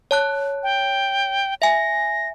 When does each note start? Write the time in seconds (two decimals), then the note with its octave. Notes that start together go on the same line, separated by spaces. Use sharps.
0.11 C#5 A5 F#6
0.63 G5
1.62 E5 G#5 A#6